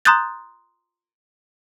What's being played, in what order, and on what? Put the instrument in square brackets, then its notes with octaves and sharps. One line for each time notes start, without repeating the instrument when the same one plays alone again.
[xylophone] A#5 C6 D#6 F#6 G6 A6